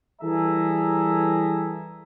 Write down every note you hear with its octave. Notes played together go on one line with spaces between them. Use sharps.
E3 G3 G#4 A4 E5 A#5